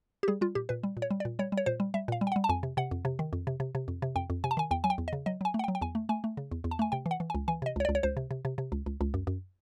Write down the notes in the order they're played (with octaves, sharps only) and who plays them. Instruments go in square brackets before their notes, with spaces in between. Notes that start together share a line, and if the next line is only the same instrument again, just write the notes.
[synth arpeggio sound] G4
G3 G#4
G3 F4
A#2 G4
A#2 B4
G3
A#2
C#5
G3
D5
A#2
G3 C#5
G3
C#5
A#2 C5
G3
G3 E5
A#2 F5
G3
G5
F#5
G3
A5
F2 G#5
C3
C3 F#5
F2
C3
D#3
F2
C3
C3
C3
F2
C3
F2 G5
F2
C3 G#5
A5
D#3 G#5
E2 G5
F#3 G#5
G5
E2
D#5
C#3
F#3 D#5
F#3 G#5
A3
F#5
G5
F#3
G5
E2 G#5
A3
A3 G#5
A3
C#3
E2
E2
A5
A3 G#5
C3 G5
E3
F#5
E3
G#5
C#2
E3 G#5
C3 D#5
C#2
C#5
D5
C#2
C#5
C#2 C5
C3
C3
C3
C3
C#2
C#2
C#2
F#2
F#2